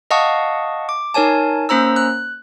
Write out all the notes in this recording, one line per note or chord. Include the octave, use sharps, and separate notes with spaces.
D#5 F5 F#5 A5 C#6 D#6
D6
D#4 A#4 C#5 G#5 A5
A#3 C#4 C5 A#5 E6
F#6